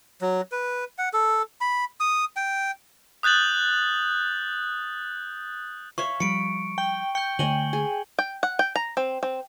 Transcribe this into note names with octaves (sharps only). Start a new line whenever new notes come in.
F#3
B4
F#5
A4
B5
D#6
G5
D#6 F#6 G6 A6 F#7
C#5 E5 F5 C#6
F3 G3 B5 C#7 D7
G5
G5 G6 C#7
D3 A3 C#5 D#5 G#5 F#7 G7
G#4
G5
F#5
G5
A#5
C4
C4